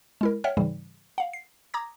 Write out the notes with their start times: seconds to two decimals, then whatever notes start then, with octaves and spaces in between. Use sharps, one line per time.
0.21 G#3 E4 A#4
0.44 C#5 E5 F#5 G5 F6
0.57 G#2 C#3 E3 G3
1.18 F5 F#5
1.33 C7
1.74 A#5 D6 D#6 G#6 A#6